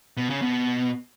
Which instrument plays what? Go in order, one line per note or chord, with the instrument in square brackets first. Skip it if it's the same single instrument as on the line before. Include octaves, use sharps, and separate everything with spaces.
[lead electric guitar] B2
C#3
B2